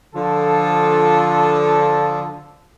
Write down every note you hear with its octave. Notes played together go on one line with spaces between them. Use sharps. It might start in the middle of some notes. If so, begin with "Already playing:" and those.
D3 F3 A4